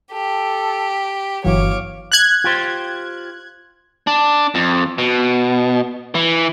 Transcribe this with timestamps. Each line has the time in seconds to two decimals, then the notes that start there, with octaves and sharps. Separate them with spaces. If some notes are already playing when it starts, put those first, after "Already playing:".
0.12 G4 A4
1.44 G1 E3 F#3 C#5 F5 D6
2.12 F#6 G#6
2.44 F4 G4 C5
4.07 D4
4.55 F2
4.98 B2
6.15 E3